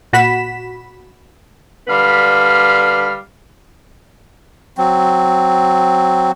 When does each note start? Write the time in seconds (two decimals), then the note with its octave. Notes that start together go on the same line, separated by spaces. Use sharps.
0.13 A#2 F#4 B5 B6 E7
1.88 D3 G3 B4 F5
4.78 F#3 C4